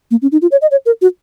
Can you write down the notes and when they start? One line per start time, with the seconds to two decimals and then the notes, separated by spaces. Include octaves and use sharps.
0.11 A#3
0.22 C#4
0.32 D#4
0.42 F4
0.52 C#5
0.62 D#5
0.71 C#5
0.86 A#4
1.02 F#4